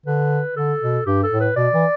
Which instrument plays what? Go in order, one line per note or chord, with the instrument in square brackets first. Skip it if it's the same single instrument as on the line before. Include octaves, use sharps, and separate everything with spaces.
[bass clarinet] D3 [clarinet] B4
[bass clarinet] D3 [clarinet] A4
[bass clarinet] B2
[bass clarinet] G2 [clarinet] G4
[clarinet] A4
[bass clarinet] A2
[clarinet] B4
[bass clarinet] B2 [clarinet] D5
[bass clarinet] E3